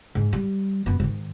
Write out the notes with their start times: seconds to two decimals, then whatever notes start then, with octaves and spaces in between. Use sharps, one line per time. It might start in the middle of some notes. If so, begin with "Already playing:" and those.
0.15 G#2
0.33 G3
0.86 F#2 B3
1.00 G#2 D#3